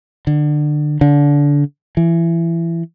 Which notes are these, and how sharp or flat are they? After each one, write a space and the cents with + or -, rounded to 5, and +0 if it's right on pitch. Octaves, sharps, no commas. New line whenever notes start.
D3 +25
D3 -25
E3 +20